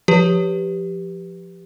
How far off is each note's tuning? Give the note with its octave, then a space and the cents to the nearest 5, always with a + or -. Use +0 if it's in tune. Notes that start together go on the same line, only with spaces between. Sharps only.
F3 +0 G4 +0 B4 +0